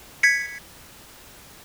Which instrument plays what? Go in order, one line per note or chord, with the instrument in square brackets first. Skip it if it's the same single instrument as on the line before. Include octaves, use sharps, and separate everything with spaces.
[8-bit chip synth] G#6 B6 C#7